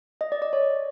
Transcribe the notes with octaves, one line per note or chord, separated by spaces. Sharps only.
D#5
D5
D5
C#5